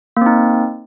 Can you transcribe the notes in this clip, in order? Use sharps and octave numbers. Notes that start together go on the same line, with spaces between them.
A#3 C4 D#4